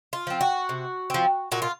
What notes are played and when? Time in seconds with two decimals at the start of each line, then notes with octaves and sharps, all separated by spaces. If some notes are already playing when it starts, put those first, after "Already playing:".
0.13 F4
0.27 F3 C4
0.41 F#4
0.69 C3
1.10 F3 C4
1.52 A#2 F#4
1.62 F4